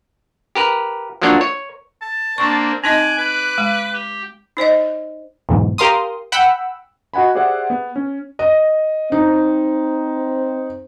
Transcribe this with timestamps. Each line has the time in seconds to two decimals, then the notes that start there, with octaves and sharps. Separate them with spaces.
0.55 G4 A#4 B4
1.22 F3 F#3 A#3 D4 C#5 D5
1.41 C#5
2.02 A5
2.38 A#3 C4 D4 C#6
2.84 C4 D#4 D#5 G#5 D6 F#6
3.18 B4
3.58 G#3
3.93 G4
4.57 D#4 C5 D5 D#5
5.49 B1 E2 G#2
5.78 G4 A#4 F5 C6 D#6
6.32 F#5 G5 B5 E6
7.14 F#4 D#5 F#5 G#5 B5
7.35 G4 G#4 C5 D5 E5 F#5
7.70 B3
7.96 C#4
8.39 D#5
9.12 C4 D#4